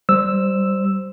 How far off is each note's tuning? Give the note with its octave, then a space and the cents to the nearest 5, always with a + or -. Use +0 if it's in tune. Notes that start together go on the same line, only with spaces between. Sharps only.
G3 -15 C5 +0 E6 +0